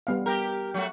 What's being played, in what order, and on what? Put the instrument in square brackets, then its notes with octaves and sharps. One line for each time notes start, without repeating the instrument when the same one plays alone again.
[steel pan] G3 B3 F5
[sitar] G4 A#4
F#3 A3 F#4